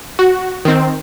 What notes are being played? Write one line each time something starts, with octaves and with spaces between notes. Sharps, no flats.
F#4
D#3 C4